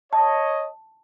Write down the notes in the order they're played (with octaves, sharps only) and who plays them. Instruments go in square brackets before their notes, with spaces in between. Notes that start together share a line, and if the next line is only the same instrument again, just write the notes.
[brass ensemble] C#5 D#5 [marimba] A5